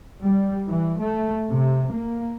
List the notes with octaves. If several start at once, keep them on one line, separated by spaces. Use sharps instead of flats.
G3
E3
A3
C3
A#3